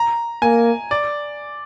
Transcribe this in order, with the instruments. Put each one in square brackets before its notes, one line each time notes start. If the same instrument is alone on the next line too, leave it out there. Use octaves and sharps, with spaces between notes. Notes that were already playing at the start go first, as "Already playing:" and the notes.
Already playing: [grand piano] A#5
[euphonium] A#3 [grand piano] G#5
[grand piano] D5